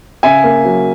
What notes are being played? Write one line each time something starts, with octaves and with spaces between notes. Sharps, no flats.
C#3 E5 G#5
A#3
F#3